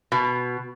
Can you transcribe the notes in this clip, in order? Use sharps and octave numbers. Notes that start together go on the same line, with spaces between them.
B2